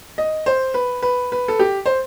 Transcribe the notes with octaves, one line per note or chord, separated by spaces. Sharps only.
D#5
C5
B4
B4
B4
A4
G4
C5